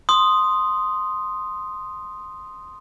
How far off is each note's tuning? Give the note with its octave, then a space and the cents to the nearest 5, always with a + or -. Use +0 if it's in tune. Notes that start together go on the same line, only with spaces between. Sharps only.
C6 +0 D#6 +0